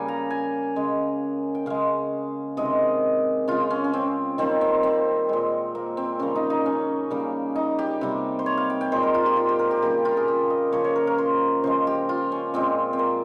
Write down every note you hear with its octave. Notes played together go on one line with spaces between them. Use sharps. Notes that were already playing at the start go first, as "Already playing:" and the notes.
Already playing: C#3 G3 A#3 G#5
A#5
G#5
C#3 G#3
G5
C#3 G#3 F5
C3 D#3 G#3 D#5
C#3 G#3 F4
C#4
C#4
C4
D#3 G3 A#3 C4
C4
C4
A#2 G#3
A#3
C4
C#3 G3 A#3 C#4
D#4
D#4
C#4
C#3 G3 A#3
D#4
G4
C3 G3 A#3
C5
C#5
F5
G5
G5
A#2 G#3 C5
A#4
F4
G4
F4
G4
A#4
G4
C#3 G3 A#3 G4
F4
G#4
G4
D#5
C#3 F3 A#3 C#5
C#5
A#4
A#4
C5
C#3 F3 G#3 C5
G4
F4
C#4
A#2 G#3 C4
C4
A#3